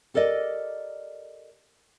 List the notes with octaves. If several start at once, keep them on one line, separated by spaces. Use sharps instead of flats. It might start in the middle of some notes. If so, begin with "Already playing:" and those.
G4 A4 A#4 D5 D#5